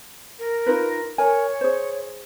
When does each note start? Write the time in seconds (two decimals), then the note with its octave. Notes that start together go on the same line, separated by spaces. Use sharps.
0.39 A#4
0.67 D#4 F4 B4
1.18 A#4 C#5 G#5
1.61 G#4 C5